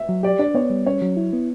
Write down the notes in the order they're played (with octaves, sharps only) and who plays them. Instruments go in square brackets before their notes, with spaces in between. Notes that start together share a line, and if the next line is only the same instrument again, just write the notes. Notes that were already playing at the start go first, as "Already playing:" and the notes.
Already playing: [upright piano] E5
[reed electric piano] F#3
[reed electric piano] G4 [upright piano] D5
[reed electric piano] D4 [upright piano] D5
[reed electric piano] B3 [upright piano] C#5
[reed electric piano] G3
[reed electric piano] C#4 [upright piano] C#5
[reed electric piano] F#3
E4
B3